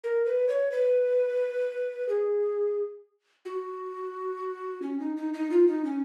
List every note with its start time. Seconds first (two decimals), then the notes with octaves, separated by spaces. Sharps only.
0.04 A#4
0.26 B4
0.49 C#5
0.72 B4
2.09 G#4
3.45 F#4
4.82 C#4
5.00 D#4
5.17 D#4
5.34 D#4
5.51 F4
5.67 D#4
5.85 C#4